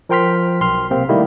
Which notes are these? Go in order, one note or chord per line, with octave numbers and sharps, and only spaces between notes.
F3 A#4 G5 C6 F6 B6
B1 C6 F6
C3 A#3 C4
D#3 G3 A3 A#3 E4